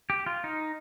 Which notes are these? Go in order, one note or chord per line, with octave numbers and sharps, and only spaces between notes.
G4
F4
D#4